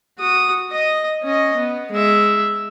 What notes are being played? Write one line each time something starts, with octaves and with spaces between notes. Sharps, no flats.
F#4 D#6
D#5 D#6
C#4 D#5
B3
G#3 E5